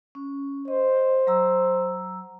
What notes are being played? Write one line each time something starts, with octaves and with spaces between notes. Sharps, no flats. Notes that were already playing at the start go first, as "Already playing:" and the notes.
C#4
C5 D#5
F#3 A#5 E6